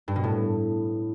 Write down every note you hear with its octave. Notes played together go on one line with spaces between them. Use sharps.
G2
B2
A2